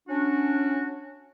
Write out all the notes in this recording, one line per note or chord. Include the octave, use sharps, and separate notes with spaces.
C#4 D4 F#4